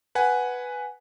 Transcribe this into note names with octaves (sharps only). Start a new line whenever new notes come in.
B4 F#5 G#5